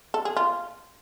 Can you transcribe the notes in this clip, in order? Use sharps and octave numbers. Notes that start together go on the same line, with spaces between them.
A4
G#4
F4